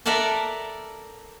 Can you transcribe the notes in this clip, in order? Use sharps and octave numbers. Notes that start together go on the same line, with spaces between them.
A4 A#4 D5 E5 F#5 A5